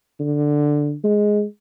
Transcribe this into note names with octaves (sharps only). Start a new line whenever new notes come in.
D3
G#3